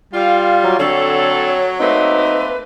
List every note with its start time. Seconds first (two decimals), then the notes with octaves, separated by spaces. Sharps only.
0.13 G3 F4 F5
0.64 F#3
0.79 D3 F#3 C4 A4 C#5
1.80 A3 A#3 C4 D#4 B4